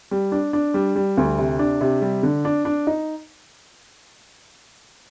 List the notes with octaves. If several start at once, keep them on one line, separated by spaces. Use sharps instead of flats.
G3
D4
D4
G3
G3
D2
C3
D4
C3
G3
D3
D4
D4
D#4